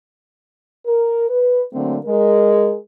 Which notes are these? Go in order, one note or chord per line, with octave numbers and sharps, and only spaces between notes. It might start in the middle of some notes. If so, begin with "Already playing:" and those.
A#4
B4
D3 F#3 A3 A#3 C4
G#3 A#4